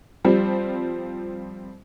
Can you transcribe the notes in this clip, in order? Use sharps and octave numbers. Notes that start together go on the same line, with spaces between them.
F3 G3 C4